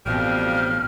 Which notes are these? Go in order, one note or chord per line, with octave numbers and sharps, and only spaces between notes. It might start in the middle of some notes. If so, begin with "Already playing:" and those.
A1 F2 B2 F3 G3 F6